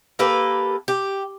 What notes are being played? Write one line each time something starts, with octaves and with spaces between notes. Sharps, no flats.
A#3 G4 A4 B4
G4